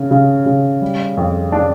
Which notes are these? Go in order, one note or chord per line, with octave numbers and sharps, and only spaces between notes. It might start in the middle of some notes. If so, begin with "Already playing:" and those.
Already playing: C#3
C#3
C#3
G3
F2
D4